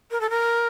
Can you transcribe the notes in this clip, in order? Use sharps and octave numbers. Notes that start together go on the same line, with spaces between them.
A#4
A4
A#4